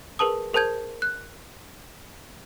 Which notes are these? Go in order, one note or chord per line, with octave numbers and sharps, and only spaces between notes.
G#4 A#4 B4 A5 D#6
G#4 A#4 C5 A5 G6 G#6
F#6